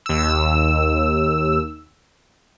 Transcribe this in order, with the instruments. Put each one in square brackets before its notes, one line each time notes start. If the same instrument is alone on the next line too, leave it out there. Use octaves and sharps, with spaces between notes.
[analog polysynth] D#2 E6